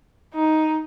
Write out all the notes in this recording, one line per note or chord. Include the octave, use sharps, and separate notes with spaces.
D#4